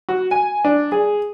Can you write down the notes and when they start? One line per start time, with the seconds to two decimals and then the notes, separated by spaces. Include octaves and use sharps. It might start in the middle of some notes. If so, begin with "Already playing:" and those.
0.09 F#4
0.31 G#5
0.65 D4
0.92 G#4